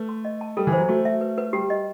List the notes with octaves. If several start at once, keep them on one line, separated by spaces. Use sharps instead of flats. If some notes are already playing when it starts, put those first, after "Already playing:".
Already playing: A3 B4
C6
D#5
A5
G3 A4
E3
C5
F#3
A3 F#4
E5
B4
B4
G3 G4
D#5